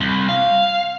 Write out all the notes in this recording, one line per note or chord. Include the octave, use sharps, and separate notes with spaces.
C2
F5